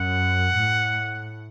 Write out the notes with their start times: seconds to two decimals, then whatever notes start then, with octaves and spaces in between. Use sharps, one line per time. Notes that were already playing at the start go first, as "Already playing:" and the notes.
Already playing: F#2 F#5
0.54 A2